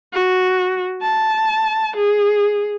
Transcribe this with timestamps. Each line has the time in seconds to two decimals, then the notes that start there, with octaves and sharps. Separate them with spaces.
0.13 F#4
1.01 A5
1.96 G#4